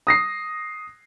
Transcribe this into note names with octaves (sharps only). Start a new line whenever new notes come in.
D#6 A#6 C7